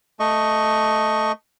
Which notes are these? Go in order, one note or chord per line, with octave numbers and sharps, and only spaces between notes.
A3 D#5 C#6